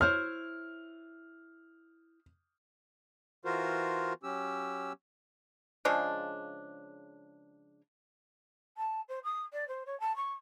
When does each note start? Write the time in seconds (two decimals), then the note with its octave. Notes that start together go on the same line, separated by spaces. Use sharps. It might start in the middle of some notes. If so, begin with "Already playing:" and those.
0.01 E4 C5 C#5 F6
3.45 E3 F4 F#4 A#4 C5
4.23 F#3 C#4 G4 E6
5.85 C#3 F3 G#3 D4
8.77 A5
9.09 C5
9.24 D#6
9.53 D5
9.68 C5
9.86 C#5
10.00 A5
10.16 C#6